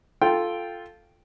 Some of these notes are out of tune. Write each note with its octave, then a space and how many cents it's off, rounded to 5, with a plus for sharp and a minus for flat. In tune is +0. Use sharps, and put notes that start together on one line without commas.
F4 +0 A4 +0 G5 +0